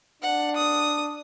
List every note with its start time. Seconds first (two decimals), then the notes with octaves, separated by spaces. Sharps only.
0.22 D4 F#5
0.56 D#6